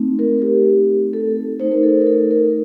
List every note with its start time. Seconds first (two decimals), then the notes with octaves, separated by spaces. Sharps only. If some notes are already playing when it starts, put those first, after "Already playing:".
Already playing: A3 C4 D#4
0.19 A#4
0.42 G4
1.13 A4
1.60 A3 D#4 C5
1.72 A#4
1.83 A4
2.01 A#4
2.07 A4
2.31 A#4